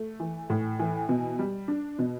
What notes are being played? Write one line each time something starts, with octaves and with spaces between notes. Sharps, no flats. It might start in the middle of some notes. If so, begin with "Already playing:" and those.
Already playing: A3
E3
A2
E3
B2
G3
D4
B2